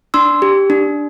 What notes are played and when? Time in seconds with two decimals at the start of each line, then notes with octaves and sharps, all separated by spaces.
0.14 D4 C6 E6
0.42 G4
0.70 D4